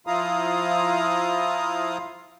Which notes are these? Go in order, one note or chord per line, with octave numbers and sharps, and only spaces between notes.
F3 E4 F4 F5 A#5 D#6